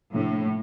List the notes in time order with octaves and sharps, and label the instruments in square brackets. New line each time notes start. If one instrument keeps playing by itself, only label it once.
[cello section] A2 [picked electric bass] C3 F3 A#3 D4